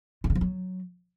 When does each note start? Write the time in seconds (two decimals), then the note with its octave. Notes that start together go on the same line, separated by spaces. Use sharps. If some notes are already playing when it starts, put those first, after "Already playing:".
0.24 D3
0.30 C#3
0.35 F3
0.41 F#3